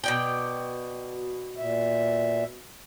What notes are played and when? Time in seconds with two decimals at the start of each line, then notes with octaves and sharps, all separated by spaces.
0.04 B2 D5 G5
1.57 A#2 E5